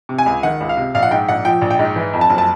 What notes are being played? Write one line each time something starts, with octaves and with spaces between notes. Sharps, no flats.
C3
G#5
C#2
D#3 F#5
C#2
F5
C3
A#1 F5
F#5
G#2 G5
A#1 F#5
F3 G5
A#1
G5
G#2
E3
F2
A5
F#1
A5